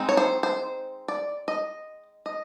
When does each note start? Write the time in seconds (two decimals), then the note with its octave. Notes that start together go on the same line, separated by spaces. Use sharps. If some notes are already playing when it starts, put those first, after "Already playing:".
Already playing: G#3 C4 D#4
0.09 C#5
0.17 C5
0.43 C5
1.08 D5
1.48 D#5
2.26 D#5